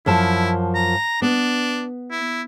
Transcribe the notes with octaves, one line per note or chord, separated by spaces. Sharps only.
F#2 F3 E4 A5
A#5
B3 D4
E4